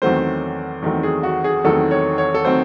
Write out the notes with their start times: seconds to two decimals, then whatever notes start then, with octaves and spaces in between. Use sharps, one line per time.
0.02 E2 D#3 F#3 A3 C4 C5
0.82 E2 D#3 F#3 A3 C4
1.03 G#4
1.23 F#4
1.44 G#4
1.64 E2 D#3 F#3 A3 C4 A4
1.91 C#5
2.18 C#5
2.34 A4
2.45 D#3 F#3 A3 C4 C5